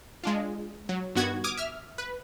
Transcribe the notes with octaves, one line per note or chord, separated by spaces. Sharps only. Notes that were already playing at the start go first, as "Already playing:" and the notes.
G#3 D4 F4
F#3
G2 D#3 B3 F#4 F#5 G#6
D6 D#6 F6 G#6
E5 F6
B4 F#6